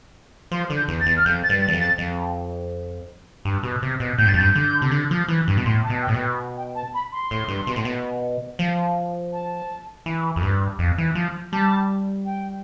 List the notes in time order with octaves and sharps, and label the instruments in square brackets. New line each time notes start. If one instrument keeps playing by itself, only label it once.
[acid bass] F3 [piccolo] C6
[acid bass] D3
[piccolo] G6
[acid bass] E2
[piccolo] A6
[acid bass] E2
[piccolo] F6
[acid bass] F2 [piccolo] G6
[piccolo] A6
[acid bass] G2
[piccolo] A6
[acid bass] E2
F2
[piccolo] A6
[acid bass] F2
G2
B2
C3
B2
[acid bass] A2 [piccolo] G6
[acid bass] G2
[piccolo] A6
[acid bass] F2
[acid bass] G2 [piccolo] G6
[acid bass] D3
C3
D3
F3
E3
G2
B2
[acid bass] A2 [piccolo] C6
[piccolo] A5
[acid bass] B2
[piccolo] G5
[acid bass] A2
B2
[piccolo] G5
G5
A5
B5
C6
[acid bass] A2
G2
B2
A2
B2
F3
[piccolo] A5
[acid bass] E3
F2
G2
F2
E3
F3
[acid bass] G3 [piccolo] A5
[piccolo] G5